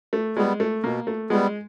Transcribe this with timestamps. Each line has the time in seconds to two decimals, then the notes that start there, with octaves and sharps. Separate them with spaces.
0.13 A3
0.37 G3 G#3 B3
0.60 A3
0.83 B2 A#3
1.07 A3
1.30 G3 G#3 B3